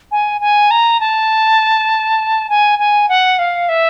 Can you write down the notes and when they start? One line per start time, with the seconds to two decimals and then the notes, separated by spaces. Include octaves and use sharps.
0.11 G#5
0.41 G#5
0.71 A#5
1.00 A5
2.49 G#5
2.79 G#5
3.09 F#5
3.39 F5
3.69 E5